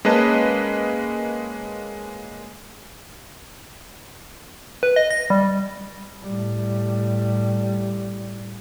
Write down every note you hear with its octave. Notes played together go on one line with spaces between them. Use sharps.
G#3 A#3 C#4 B4 D#5 A5
B4
D#5
A#6
G3
A2 G3